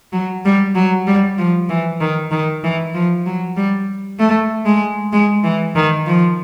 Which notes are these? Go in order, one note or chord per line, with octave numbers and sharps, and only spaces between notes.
F#3
G3
F#3
G3
F3
E3
D#3
D#3
E3
F3
F#3
G3
A3
G#3
G#3
E3
D#3
F3